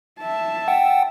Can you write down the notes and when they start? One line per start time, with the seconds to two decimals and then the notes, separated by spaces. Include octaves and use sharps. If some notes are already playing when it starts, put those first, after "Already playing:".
0.19 E5 A5
0.68 F#5 G5